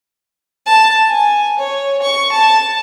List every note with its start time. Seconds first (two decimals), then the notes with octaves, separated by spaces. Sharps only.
0.66 A5
1.08 G#5
1.59 C#5
2.02 C#6
2.32 A5